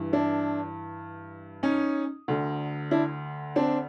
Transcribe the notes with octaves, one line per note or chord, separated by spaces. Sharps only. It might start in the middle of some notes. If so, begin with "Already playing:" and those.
Already playing: G2 E3
D4 E4
C#4 D#4
D2 D3
D4 E4
C4 D4